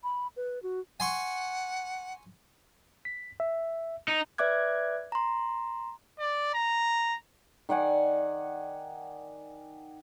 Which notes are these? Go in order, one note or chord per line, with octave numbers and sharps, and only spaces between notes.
B5
B4
F#4
F#5 G#5 C6 C#6
B6
E5
D#4
B4 D5 E5 D6 F#6 G#6
A#5 C6
D5
A#5
D#3 D5 F#5 G#5